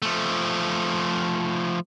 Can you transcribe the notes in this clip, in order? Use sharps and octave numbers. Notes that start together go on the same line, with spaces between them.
F3 A3